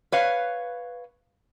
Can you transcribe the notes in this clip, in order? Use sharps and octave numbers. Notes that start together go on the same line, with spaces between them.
B4 C#5 F5